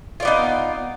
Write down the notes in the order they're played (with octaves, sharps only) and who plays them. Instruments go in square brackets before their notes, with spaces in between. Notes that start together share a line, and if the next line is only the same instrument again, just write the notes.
[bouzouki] F4
D5
B3
D#4